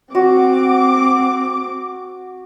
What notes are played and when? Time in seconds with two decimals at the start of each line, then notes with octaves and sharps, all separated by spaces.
0.15 C4 F#4 D6